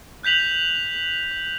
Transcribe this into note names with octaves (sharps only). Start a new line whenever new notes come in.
F#6 G6 B6 F7 F#7